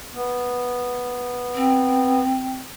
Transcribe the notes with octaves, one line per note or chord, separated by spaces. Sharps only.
B3
C4